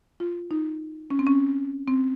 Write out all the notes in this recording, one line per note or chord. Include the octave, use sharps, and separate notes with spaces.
F4
D#4
C#4
C4
C#4
C4